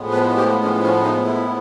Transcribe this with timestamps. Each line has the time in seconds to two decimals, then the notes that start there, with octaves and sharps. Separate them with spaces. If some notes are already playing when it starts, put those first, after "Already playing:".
Already playing: A2 F3 G#3 B3
0.11 B4
0.36 G4
0.63 C#4
0.83 C#4
1.03 D#4
1.23 E4